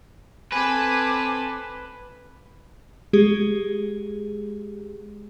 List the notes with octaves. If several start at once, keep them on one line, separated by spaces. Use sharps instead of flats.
C4 A4 B4 G#5 D6
G#3 G4 G#4